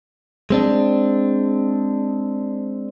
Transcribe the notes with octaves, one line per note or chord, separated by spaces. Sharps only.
G#3 C4 D4